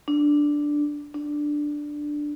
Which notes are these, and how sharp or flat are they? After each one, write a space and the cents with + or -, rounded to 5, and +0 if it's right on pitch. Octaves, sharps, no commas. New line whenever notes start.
D4 +0
D4 +5